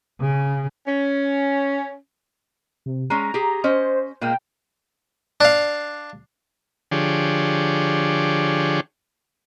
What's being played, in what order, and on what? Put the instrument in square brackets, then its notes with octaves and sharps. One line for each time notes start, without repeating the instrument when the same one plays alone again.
[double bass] C#3
[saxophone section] C#4
[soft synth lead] C3
[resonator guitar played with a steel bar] G#3 C#4 [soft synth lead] A#5
[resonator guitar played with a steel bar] G4 G#4
[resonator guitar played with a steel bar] C#4 D#5 [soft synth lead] C5
[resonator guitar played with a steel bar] A#2 G#3 A#3 [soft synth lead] G5
[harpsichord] D4 F5
[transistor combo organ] D3 F3 D4 G4 G#4 C#5